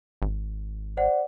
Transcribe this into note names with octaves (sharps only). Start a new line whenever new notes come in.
G#1
C5 D5 F#5